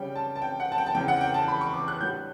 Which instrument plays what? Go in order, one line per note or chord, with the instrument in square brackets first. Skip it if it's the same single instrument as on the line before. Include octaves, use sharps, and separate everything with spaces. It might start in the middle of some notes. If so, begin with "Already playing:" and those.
Already playing: [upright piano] C#3 G3 C#4 G5
A5
A5
G5
F#5
A5
G5
A5
E2 C#3 E3 G5
F#5
G5
A5
B5
C#6
D6
F#6
A2 G3 D4 G6